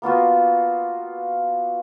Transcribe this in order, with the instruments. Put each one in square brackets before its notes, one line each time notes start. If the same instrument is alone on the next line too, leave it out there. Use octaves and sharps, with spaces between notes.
[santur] A#3 B3 F4 F#4